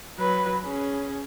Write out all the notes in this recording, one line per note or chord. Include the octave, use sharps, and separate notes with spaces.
F#3 B4
C#4 G#4